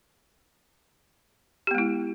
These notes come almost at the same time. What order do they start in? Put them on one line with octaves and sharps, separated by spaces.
G4 B3 G#3 E4